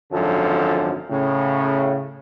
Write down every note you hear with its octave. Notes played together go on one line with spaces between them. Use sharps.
G#1 F#2 D3 F3 A4
A2 C#3